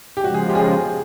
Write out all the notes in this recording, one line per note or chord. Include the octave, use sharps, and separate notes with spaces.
G4
C#3 F3 G#3 F#4
G#4
G4
G#4